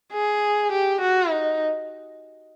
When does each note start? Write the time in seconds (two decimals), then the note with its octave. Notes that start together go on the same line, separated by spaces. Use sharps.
0.13 G#4
0.72 G4
1.01 F#4
1.30 D#4